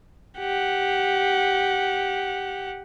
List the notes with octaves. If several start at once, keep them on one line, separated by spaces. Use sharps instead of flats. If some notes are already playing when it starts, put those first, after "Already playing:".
G4 F#5